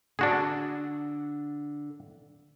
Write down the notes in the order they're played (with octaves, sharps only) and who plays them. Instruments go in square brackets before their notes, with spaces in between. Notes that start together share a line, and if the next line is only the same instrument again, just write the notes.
[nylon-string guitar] D3 [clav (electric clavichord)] D4 F#4 G#4